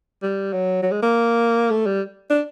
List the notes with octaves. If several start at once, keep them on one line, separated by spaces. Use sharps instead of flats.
G3
F#3
F#3
G#3
A#3
A3
G3
D4